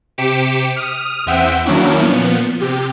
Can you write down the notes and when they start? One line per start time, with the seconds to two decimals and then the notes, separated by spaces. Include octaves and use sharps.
0.18 C3 G4 D6 B6 C#7 E7
0.76 D#6 F6
1.26 E2 C4 E5 F#5 G5 D#7
1.65 D#3 F#3 A#3 C#4 D4 E4
2.00 A#2 F3 B3
2.60 C3 G4